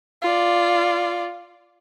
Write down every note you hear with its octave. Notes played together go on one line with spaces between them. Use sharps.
F4 D5